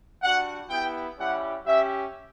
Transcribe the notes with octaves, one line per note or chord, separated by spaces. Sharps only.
G3 D4 F#4 F#5
B3 E4 G4 G5
G3 C#4 E4 G4 F#5
C#4 G4 E5